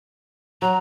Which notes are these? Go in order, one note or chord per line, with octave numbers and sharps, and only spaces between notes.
F#3 A#5